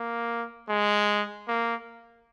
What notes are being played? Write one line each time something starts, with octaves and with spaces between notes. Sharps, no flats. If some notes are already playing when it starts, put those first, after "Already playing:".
Already playing: A#3
G#3
A#3